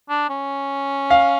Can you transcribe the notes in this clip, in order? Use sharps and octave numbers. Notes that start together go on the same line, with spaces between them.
D4
C#4
F5